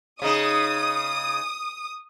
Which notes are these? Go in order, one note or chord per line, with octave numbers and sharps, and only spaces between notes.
C#3 D#4 D#6